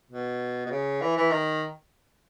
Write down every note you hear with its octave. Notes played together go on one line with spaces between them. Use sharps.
B2
B2
C#3
E3
E3
D#3